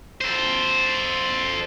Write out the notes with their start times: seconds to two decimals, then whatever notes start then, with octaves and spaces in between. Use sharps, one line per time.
0.21 A4 C5